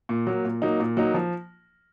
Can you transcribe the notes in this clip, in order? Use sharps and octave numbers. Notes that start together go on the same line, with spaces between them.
A#2
F#3 A#3
A#2
F#3 A#3 D#4
A#2
F#3 A#3 D#4
F3